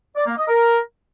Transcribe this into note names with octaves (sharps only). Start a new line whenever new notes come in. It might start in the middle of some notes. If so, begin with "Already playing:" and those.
D5
A#3
D#5
A#4